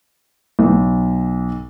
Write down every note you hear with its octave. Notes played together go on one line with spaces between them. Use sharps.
B1